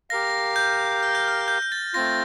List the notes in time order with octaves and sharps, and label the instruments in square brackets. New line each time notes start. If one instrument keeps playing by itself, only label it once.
[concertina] G4 A#4 F5 [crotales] A#6
[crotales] G6
F6
G6
F6
G6
G6
A6
[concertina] A3 C4 F4 [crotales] A#6